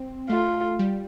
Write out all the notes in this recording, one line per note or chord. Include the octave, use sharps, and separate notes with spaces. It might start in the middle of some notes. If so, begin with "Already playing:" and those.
Already playing: C4
A3 F4
G3